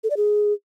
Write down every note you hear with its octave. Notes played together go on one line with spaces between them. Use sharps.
A4
D5
G#4